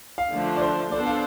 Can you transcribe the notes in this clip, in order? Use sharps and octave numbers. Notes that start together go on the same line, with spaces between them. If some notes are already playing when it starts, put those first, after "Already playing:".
F5
D3 F3 A3 D4
D5
C5
B3 D4 A4 C5 D5
F5